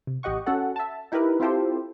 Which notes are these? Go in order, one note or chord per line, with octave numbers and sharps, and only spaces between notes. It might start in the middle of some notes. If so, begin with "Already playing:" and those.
C3
A1 G4 D#5 F#5 C#6
C#4 F#4 A4 F#5
E5 A5
D#4 E4 G4 A#4 B4
C4 E4 F4 G4 A4 C5